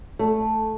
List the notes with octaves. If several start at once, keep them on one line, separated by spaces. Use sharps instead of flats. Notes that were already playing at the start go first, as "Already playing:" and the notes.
A3